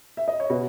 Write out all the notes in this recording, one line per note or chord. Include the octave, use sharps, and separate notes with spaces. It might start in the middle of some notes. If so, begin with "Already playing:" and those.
E5
D#5
C#5
B2 B4